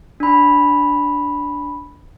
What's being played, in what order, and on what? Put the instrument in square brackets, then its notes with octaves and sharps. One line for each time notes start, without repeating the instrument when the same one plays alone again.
[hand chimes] D4 B5